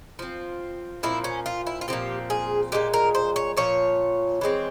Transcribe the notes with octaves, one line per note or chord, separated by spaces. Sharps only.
F3 C4
A#2 F3 C4 E4
C#4
F4
E4
F4
A#2 F3 C4 G4
G#4
A#2 F3 G#3 G4
A#4
C5
C#5
A#2 F3 C#5
E3 G#3 C4